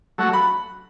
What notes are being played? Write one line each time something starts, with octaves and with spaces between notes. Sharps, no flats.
F#3 A3 F#4
B5